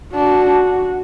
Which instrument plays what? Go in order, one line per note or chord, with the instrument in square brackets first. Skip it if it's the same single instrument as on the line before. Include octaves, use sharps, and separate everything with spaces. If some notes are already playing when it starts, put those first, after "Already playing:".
[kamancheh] D4 [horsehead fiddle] F#4